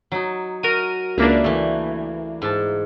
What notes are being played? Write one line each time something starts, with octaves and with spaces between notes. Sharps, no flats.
F#3 D#4
F#4 A#4 D#7
C#2 A#3 D4 B4 E5 A#5
E3 A3
G#2 A5